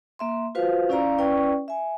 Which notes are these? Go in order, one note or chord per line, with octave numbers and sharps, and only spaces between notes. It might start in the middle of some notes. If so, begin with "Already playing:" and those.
A#3 E5 C6
F4 F#4 B4 C5 F5
C#4 E4 D5 F5 A#5
C#4 E4 B4 D5 G5 C#6
E5 G#5